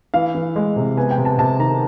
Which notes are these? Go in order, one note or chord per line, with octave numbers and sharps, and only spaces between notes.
E3 F5
E3
G#3
C3
B3 G#5
G5
C3
A5
C3 A5
D#3 A#5